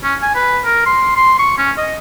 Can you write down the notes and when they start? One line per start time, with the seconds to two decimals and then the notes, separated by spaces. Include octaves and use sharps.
0.03 C#4
0.23 G#5
0.35 B4
0.65 A#4
0.86 C6
1.17 C6
1.39 C#6
1.58 C#4
1.78 D#5